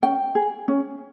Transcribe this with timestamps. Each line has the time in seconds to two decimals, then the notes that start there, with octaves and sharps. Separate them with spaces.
0.02 C#4 G5
0.35 G#4
0.68 C#4